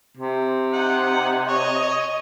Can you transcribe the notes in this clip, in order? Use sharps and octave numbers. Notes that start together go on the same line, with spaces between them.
C3
D#4 F#5
C#5 D#5